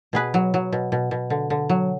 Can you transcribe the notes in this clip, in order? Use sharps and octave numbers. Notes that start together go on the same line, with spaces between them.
B2 G#4 B4
F#3
F#3
B2
B2
B2
D3
D3
F#3